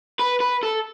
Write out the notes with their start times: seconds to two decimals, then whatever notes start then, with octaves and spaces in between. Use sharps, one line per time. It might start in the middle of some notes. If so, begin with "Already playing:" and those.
0.19 B4
0.40 B4
0.63 A4